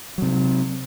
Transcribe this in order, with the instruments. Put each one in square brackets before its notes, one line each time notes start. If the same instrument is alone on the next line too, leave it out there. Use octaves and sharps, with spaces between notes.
[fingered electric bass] C3 F#3